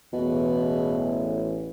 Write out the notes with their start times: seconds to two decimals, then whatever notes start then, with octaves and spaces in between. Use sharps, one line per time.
0.13 A1 E2 B2